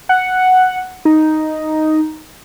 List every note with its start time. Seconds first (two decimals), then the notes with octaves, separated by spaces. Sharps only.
0.09 F#5
1.05 D#4